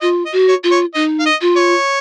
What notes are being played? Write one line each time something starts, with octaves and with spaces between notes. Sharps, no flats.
F4 D#5
D#5
F#4
C#5
F4
C#5
D#4 D#5
F5
D#5
F4
C#5